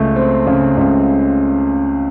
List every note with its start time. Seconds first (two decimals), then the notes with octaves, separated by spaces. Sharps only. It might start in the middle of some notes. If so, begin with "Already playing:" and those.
Already playing: C#2 C#3 A3
0.16 C4
0.47 C#3
0.77 C#2